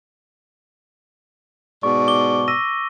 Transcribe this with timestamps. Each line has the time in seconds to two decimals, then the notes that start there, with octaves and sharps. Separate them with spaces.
1.83 G#2 B2 D5 C#6
2.08 D6 G7
2.48 E6 A#6 D#7